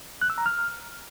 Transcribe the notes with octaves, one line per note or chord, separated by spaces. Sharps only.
F#6
E6
A#5
F6